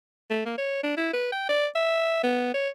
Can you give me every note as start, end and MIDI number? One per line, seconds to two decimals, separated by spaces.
0.30 0.42 57
0.46 0.54 58
0.58 0.83 73
0.83 0.94 62
0.97 1.10 64
1.14 1.30 71
1.32 1.48 79
1.49 1.67 74
1.75 2.20 76
2.24 2.49 59
2.54 2.69 73